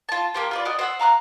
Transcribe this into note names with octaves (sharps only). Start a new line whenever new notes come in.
F4 A5
A#3 G4 C5
F4 B4 D5
F#4 D5 D#5
C5 F#5 E6
F5 A#5 C6 F#6